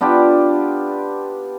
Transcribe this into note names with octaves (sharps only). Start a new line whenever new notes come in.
B3 D4 F4 G4